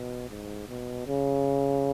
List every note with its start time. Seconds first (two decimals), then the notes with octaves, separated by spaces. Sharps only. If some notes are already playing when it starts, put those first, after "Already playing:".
Already playing: B2
0.30 G#2
0.68 B2
1.07 C#3